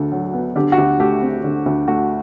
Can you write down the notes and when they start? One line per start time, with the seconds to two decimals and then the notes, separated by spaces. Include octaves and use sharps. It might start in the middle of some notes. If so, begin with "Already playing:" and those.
Already playing: D2 D3 A4
0.12 F#3
0.34 B3
0.56 D3 G4
0.72 F#4
0.77 D2 G4
0.99 A3 G4
1.22 C4
1.44 D3
1.66 D2
1.88 A3 F#4